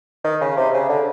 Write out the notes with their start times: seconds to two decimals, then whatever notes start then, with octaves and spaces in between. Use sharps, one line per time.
0.24 D#3
0.41 C#3
0.57 C3
0.74 C#3
0.89 D3